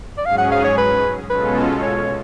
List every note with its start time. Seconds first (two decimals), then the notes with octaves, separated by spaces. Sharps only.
0.18 D5
0.25 G#2 F#3 C#4 G#4 F5
0.38 F#5
0.52 F5
0.65 C#5
0.78 B4
1.30 B2 G#3 C#4 F4 A4 B4
1.82 C#5